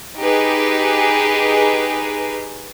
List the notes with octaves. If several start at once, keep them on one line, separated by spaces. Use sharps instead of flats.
D#4 G4 G#4 B4